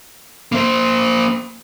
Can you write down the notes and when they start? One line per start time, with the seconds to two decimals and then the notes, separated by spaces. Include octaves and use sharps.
0.52 A#3 C5